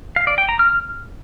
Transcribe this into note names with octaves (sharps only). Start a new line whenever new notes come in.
F5
D5
G5
A#5
F6